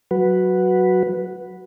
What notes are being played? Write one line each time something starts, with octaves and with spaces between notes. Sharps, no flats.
F#3 F#4 B4